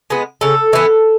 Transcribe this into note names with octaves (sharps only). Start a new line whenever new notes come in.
G#3 B3
C#3 A4
E3 B3